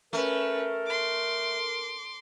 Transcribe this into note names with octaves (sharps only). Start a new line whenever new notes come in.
A3 C#4 A#4 B4
C6 D6